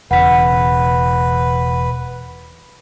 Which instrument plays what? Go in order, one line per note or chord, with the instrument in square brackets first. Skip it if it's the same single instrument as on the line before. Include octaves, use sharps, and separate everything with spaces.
[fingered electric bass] E1 C#3 [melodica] B4 [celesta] F#5 B6